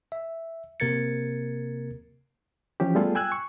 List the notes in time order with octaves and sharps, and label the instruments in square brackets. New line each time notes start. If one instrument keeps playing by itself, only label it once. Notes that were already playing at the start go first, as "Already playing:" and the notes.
[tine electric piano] E5
C3 A#3 A#4 G#6 A6 C#7
[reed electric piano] E3 F3 C#4 G4
G3 A3 B3 F4 G#4 A4
G5 G#5 E6 F#6 G#6
C#6